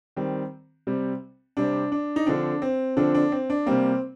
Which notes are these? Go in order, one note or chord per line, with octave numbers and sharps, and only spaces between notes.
D#3 G3 C4
C3 G3 C4
C3 G3 C4 D4
D4
D#4
D3 F3 C4 D4
C4
D3 F3 C4 D4
D4
C4
D4
C3 G3 A#3 C4